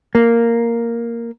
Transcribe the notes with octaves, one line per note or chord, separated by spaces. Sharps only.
A#3